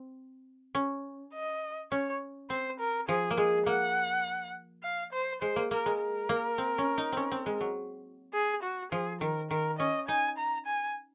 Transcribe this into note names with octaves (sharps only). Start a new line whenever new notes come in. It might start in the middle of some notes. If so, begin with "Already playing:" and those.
Already playing: C4
C#4
D#5
C#4 C#5
C4 C5
A#4
F3 G#4
A#3
G#3 G#4
A#3 F#5
F5
C5
G#3 C5
A#3
A#3 A#4
G#3
A#4
A#3
C4
C#4
D#4
C4 C#4
C4
G#3
F#3
G#4
F#4
F3 G#4
D#3 A#4
D#3 A#4
C#4 D#5
D#4 G#5
A#5
G#5